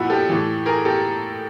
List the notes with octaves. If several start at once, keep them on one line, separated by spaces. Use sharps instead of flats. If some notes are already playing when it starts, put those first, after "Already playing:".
Already playing: A#2 F3 E4 F#4
G4 A4
A2 E3
G#4 A#4
G4 A4